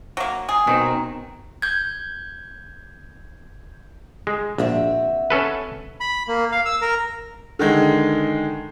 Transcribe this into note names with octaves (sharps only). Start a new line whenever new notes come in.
F#3 A#3
G#4
B2 D#3 C4
G6 G#6
G#3
A#1 C4 F#4 E5
C#4 A4 B4
B5
A#3
F5
E6
A#4
D3 D#3 G#3